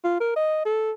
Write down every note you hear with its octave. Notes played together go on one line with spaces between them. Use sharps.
F4
A#4
D#5
A4